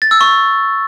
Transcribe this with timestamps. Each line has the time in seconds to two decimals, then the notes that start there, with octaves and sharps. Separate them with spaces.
0.02 A6
0.11 E6
0.21 C#6